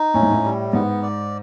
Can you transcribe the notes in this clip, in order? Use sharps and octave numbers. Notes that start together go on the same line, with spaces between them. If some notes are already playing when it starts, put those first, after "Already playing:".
Already playing: D#4
A2 C#4
G#2
A2
G3
G#2 B3
D5